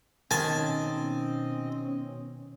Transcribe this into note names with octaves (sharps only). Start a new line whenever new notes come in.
B2 D#3 C4 C#4 D#5 G#5 A5